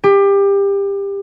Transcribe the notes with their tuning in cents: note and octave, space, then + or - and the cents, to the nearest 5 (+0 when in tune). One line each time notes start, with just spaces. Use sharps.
G4 +25